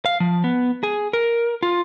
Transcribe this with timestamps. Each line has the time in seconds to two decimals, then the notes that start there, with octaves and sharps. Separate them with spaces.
0.06 F5
0.20 F3
0.44 B3
0.83 G#4
1.13 A#4
1.63 F4